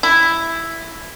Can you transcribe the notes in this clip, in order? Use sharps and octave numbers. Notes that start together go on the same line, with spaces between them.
E4